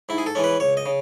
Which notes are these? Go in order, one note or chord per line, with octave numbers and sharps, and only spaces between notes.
G#2 E4
G#4
A4
E3 G#3 C#4
B4
C#2 C#5
D#5
C#3